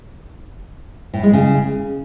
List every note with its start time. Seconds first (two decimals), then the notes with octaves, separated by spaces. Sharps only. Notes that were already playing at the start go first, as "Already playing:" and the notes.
1.14 A2
1.23 G#3
1.33 C#3